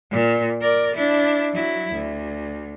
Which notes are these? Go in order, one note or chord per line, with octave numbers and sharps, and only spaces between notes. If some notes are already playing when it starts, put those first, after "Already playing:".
A#2
A#4 D5
D4 E4
F#3 E4
D2